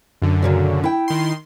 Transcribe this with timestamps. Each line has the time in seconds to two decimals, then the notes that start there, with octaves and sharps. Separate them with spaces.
0.22 F#2 D3
0.42 A#2 C#3 F#3
0.84 E4 G5
1.08 D#3 C6